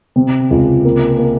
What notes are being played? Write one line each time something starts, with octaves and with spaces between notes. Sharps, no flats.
C3
C#2
A#3
A#3